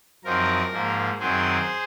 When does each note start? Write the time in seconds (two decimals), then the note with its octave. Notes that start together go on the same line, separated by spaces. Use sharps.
0.24 F#2 F3 C4 D#4 A#4
0.72 G#2 F3 A#3
1.19 F#2 D#3 F#3 C4 G#4 C5